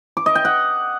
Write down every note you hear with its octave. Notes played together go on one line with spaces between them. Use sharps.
D6
D#5
G5
F#5